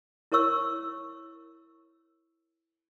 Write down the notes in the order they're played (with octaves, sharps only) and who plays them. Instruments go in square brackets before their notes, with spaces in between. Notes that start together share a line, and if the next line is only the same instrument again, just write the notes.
[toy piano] E4 A#4 C5 C#5 C#6 E6